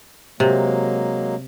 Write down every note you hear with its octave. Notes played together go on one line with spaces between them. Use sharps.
C3 F#3 G#3 A#3